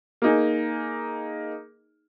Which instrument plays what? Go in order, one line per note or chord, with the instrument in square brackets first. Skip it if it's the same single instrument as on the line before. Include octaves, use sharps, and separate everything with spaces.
[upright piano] A#3 D#4 G#4